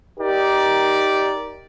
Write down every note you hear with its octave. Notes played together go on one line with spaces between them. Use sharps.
D#4 G4 A#4 D5